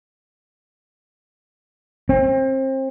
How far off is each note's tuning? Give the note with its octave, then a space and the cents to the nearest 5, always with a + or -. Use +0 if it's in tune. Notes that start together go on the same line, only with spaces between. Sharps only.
C4 +30